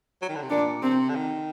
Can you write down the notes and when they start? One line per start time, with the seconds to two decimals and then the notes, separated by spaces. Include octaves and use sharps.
0.22 F#3
0.29 D#3
0.35 D3
0.43 C3
0.50 A#2 D4
0.82 C3 C4
1.09 D3
1.15 D#3